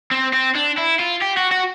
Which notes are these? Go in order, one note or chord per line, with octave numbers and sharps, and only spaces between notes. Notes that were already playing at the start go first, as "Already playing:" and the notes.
C4
C4
D4
E4
F4
G4
F#4
F#4